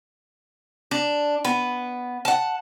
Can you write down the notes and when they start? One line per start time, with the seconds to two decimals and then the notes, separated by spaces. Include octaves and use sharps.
0.91 D4
1.45 B3
2.25 F#5 A5